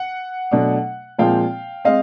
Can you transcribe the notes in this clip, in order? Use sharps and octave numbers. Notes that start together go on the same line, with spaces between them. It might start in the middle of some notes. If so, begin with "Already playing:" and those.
Already playing: F#5
B2 F#3 A3 D4
A#2 F3 G#3 C4 F5 G5
G#3 C4 D#5 F5